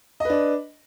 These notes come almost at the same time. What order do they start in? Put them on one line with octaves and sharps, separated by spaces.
D#5 B4 D4